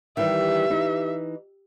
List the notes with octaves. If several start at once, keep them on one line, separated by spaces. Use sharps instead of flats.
D#3 E3 G3 G4 E5
E3 D#4